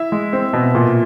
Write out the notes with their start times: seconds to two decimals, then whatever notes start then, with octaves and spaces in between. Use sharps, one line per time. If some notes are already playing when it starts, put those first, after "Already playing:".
Already playing: E4 E5
0.12 G#3
0.33 C4
0.53 B2
0.75 A#2